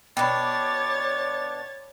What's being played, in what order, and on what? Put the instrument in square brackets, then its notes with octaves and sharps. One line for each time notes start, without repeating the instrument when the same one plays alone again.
[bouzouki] B2 D4 [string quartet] C#5 A6 [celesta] G5 B5 [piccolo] D6